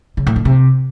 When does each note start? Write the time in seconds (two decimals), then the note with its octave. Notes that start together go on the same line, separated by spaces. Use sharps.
0.17 C#3
0.27 A2
0.36 D3
0.45 C3